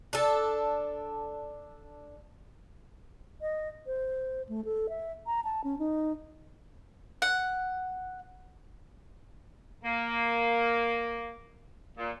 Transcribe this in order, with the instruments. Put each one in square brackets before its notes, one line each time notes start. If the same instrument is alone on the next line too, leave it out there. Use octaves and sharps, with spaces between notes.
[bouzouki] D4 A4
[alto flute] D#5
C5
A3
A4
E5
A#5
A5
C#4
D#4
[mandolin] F#5
[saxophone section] A#3
A#2